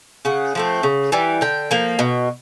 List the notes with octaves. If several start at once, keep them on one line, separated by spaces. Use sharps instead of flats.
C#3 F#5
F3 A3 C4
C#3
E3 G3
D3 G5
F3 A#3
B2